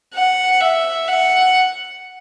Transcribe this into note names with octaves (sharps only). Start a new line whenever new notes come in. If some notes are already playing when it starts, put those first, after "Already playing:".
F#5
E5
F#5